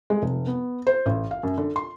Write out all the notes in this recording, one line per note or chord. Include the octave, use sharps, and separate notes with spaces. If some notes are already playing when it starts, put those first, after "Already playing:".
G#3
F1
B3
C5
A1
F5
F#2
D3
C6